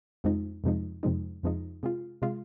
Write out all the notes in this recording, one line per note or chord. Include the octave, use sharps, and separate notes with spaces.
F2 C3 F3 G#3 D#4
F2 C3 F3 G#3 D#4
F2 C3 F3 G#3 D#4
F2 C3 F3 G#3 D#4
C3 G#3 F4
C3 G#3 F4